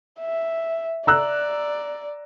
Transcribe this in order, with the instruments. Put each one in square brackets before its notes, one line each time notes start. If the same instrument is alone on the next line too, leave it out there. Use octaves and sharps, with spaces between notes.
[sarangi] E5
[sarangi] D5 [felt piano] A#5 E6 F#6